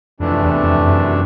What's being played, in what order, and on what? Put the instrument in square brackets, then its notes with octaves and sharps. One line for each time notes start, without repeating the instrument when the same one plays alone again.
[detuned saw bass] F2 [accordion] C3 E3 A3 D4
[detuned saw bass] E2
F2
F#2